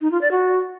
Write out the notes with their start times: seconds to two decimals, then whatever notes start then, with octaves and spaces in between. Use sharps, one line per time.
0.01 D#4
0.11 F4
0.21 D5
0.31 F#4